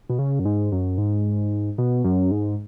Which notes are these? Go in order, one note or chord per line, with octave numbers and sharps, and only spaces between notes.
B2
C#3
F#2
G#2
F#2
G#2
B2
F#2
G#2